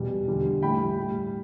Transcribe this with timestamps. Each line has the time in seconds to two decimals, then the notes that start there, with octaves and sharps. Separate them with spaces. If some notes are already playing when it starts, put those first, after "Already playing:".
Already playing: E2 B2 G3
0.28 E2 D3 G3
0.62 A2 E3 G3 G5 B5
0.97 A2 G3